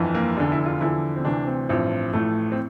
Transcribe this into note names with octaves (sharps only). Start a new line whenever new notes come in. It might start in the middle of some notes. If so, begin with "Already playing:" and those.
Already playing: G1 F2 E3
A#3
F1 E2 D3 D4
E4
F4
E2 D3 F3 E4
C4
D2 C3 E3 D4
C4
A1 G2 F3 C4
A1 A2 F3 A3
C4